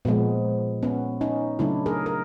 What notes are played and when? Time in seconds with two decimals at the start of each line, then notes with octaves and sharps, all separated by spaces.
0.05 A#2 F3 G#3 B3
0.83 B3 C#4
1.21 C#4 D#4
1.59 C#3 F#3 A3 D4 E4
1.86 G#4 A#4
2.06 A#4